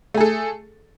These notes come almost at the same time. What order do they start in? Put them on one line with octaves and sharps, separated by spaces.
A3 G#4 A4